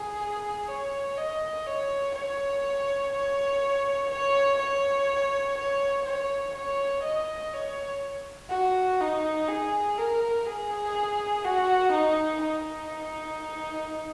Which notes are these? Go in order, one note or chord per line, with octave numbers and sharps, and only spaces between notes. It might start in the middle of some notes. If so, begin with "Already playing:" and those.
Already playing: G#4
C#5
D#5
C#5
C#5
C#5
C#5
C#5
C#5
C#5
C#5
D#5
C#5
F#4
D#4
G#4
A#4
G#4
F#4
D#4
D#4